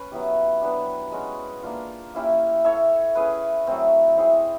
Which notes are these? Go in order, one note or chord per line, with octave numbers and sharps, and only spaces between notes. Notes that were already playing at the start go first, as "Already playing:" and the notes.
Already playing: C#4 B4
F#3 B3 E4 G4
F#3 B3 D4 G4
G#3 C#4 F#4
A#3 D4 F4
A#3 C#4 E4 G4
E4 A4 C#5 E5
C#4 E4 G#4 B4
F#3 A3 C4
C4 E4 G#4 C#5